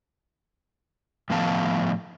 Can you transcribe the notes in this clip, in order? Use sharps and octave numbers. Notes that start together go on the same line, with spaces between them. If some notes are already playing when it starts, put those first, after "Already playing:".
A2 D#3 F3 B3 F5 A5